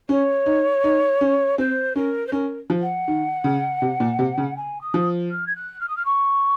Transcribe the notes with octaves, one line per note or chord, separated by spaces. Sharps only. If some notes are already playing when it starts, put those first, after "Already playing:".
C#4 C#5
D#4
D#4
C#4
C4 C5
C#4 A#4
C5
C#4 A#4
F3
F#5
D#3
C#3
C3
A#2
C3
C#3
G#5
D#6
F3
F6
G#6
F#6
F6
D#6
F6
C#6